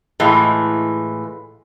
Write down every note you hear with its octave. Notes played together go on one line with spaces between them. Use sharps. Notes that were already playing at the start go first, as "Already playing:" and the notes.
A2 E3 G#3 F4